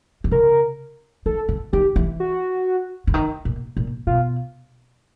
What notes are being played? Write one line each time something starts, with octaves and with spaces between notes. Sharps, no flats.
D3
C#3 A#4
D#3 A4
D3
D#3 G4
E3
F#4
D3
D#3
A#2
A#2
B2 F4